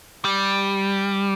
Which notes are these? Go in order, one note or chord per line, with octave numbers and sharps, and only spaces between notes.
G3